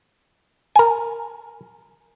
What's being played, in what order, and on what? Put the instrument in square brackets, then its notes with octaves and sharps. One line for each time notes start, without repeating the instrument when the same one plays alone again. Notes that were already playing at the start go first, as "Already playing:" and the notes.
[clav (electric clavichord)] A#4 G#5